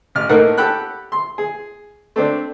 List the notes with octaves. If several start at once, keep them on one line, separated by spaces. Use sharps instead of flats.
A1 F6
A2 A3 A#3 D#4 A#4 F#5
G4 A4 F#5 G5 B5 F#6
C6
G#4
A3 C4 D4